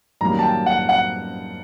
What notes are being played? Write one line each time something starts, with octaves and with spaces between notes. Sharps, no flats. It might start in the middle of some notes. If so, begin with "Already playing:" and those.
F#2 D#3 G3 A#3 A#5
A5
G5
F#5
F#5